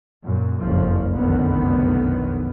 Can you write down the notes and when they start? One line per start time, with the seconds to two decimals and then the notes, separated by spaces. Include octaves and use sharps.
0.24 F#2 A#2
0.61 F#1 C2 F2 F3
1.16 F1 B1 F#2 D3 D#3 B3